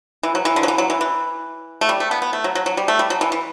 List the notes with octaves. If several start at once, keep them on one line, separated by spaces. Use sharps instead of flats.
E3
F#3
E3
D3
F#3
E3
F#3
E3
E3
A3
G3
A3
B3
B3
A3
F#3
F#3
F#3
G3
A3
G3
F#3
E3
E3